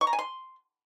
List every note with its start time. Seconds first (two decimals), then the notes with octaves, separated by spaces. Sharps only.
0.01 C#6
0.07 A#5
0.13 G#5
0.19 C6